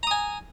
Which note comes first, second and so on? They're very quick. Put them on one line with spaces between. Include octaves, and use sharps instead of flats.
A#5 D#6 G#5